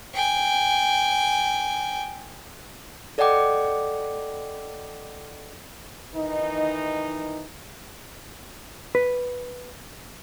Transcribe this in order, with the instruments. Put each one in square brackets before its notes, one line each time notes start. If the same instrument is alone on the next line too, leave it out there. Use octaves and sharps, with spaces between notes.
[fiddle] G5 G#5
[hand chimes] A4 D5 D#5 F#5 G5 D6
[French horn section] D#3 E3 D#4
[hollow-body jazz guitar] B4